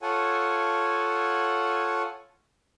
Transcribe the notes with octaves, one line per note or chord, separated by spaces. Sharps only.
F4 A4 C#5 F#5 G#5